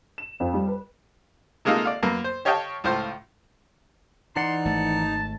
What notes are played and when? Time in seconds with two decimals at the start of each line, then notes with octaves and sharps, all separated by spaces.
0.18 E7
0.40 F2
0.54 G3
0.68 B4
1.65 C3 G#3 A#3 D#4 F4 A4
1.85 D5 F5
2.03 F#2 A#3 B3
2.24 C5
2.45 G4 C#5 D#5 F5 G5 A5
2.84 C#2 A2 F4 C5 C6
4.36 E3 D#4 D5 F#5 C6
4.65 G#1 A3 A5